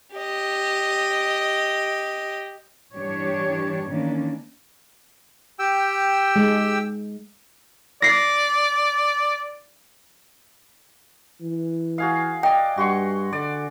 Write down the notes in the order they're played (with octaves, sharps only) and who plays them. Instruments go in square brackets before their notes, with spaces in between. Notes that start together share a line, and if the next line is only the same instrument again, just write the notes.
[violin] G4 D#5
[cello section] G2 E3 G3 D4 G4 C#5
D#3 E3 A3 A#3 C#4 D4
[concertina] G4 G5 E6
[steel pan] G#3
[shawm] D5 [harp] A#6 C7
[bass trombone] E3
[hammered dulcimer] F#4 G#4 F5
[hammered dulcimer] D5 D#5 [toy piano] G5
[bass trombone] G2 [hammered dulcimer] F#4 C6 C#6
[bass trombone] D3 [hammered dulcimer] D5